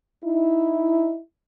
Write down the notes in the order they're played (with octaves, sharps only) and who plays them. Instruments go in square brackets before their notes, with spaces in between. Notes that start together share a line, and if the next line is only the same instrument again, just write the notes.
[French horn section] D#4 E4